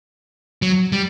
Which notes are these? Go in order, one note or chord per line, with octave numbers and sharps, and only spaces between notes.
F#3
G3